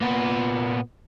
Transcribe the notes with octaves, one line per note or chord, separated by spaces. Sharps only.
A#2 B3